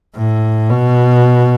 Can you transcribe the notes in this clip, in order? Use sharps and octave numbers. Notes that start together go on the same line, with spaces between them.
A2
B2